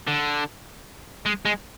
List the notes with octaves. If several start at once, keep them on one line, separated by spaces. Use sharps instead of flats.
D3
G#3
G#3